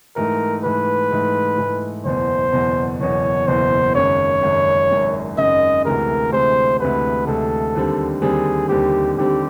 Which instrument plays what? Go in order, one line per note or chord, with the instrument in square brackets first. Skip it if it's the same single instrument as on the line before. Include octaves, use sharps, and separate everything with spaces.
[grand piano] G#2 E3 A3 [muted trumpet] A#4
[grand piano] G#2 E3 A3 [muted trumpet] B4
[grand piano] G#2 E3 A3
G#2 E3 A3
[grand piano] F#1 E2 B2 [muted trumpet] C5
[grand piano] F#1 E2 B2
[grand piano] F#1 E2 B2 [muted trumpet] C#5
[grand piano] F#1 E2 B2 [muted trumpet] C5
[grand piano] G#1 F#2 C#3 [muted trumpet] C#5
[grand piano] G#1 F#2 C#3
G#1 F#2 C#3
[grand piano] G#1 F#2 C#3 [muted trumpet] D#5
[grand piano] D2 C3 E3 G#3 [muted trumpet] A#4
[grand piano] D2 C3 E3 G#3 [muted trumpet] C5
[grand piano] D2 C3 E3 G#3 [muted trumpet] B4
[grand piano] D2 C3 E3 G#3 [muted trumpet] A4
[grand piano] D#2 D3 G3 C4
[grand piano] D#2 D3 G3 C4 [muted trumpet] G#4
[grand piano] D#2 D3 G3 C4 [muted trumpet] G4
[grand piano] D#2 D3 G3 C4 [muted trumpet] G4